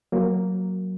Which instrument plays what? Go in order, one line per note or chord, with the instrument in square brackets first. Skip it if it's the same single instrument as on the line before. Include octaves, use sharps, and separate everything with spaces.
[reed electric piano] F#3 A#3